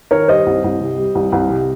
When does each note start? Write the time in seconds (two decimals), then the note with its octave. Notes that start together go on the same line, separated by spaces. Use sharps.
0.11 D#3 A#4 C#5
0.28 G3 C5 D#5
0.46 C2
0.64 C2
0.81 C3
0.97 G3
1.15 C2
1.32 C2
1.50 C3